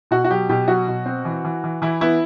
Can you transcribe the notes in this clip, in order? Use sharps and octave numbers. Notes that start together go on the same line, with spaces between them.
B2 F#4
F#4
F#3 G4
B2 G4
F#3 F#4
B2
C4
E3
E3
E3
E3 E4
B3 E4